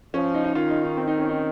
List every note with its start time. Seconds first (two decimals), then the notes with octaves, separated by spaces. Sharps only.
0.14 F3 C#4
0.34 D#4
0.45 D#4
0.55 D#3 F4
0.70 D#4
0.83 D#4
0.97 C4
1.07 D#4
1.18 C#4
1.29 D#4